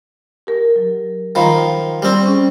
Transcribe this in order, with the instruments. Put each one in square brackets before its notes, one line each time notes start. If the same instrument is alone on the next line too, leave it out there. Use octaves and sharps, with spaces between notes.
[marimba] G4 A#4
F#3
[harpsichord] D#3 F3 [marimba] A#5 B5
[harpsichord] G3 C4
[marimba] C#4 G#4